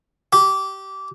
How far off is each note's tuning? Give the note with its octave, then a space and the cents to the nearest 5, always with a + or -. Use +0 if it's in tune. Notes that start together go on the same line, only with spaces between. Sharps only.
G4 -20